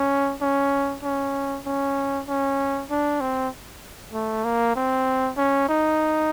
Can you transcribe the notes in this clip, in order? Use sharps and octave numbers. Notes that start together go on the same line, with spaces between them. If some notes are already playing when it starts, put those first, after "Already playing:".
Already playing: C#4
C#4
C#4
C#4
C#4
D4
C4
A3
A#3
C4
C#4
D#4